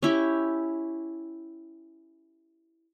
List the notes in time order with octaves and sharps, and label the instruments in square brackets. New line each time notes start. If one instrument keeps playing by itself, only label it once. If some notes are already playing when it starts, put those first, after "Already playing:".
[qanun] C#4 E4 G4